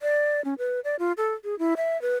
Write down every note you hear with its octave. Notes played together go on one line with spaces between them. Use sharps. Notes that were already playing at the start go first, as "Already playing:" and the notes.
D5
C#4
B4
D5
F4
A4
G#4
E4
E5
B4